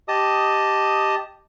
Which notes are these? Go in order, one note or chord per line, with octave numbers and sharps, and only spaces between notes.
G4 D#5 A5 D#6